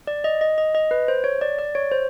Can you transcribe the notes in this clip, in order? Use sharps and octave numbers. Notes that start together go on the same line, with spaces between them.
D5
D#5
D#5
D#5
D#5
B4
C5
C#5
D5
D5
C#5
C5